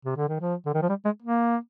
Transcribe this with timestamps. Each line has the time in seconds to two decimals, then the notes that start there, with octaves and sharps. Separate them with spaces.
0.05 C3
0.16 D3
0.28 D#3
0.40 F3
0.66 D3
0.74 D#3
0.82 F3
0.89 G3
1.05 G#3
1.22 A#3